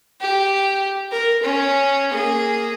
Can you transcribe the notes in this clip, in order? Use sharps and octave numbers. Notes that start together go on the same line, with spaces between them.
G4
A#4
C#4
A#3 G#4